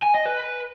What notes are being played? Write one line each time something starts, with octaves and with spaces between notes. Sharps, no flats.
G#5
D#5
B4